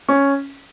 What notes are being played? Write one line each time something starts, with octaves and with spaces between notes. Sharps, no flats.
C#4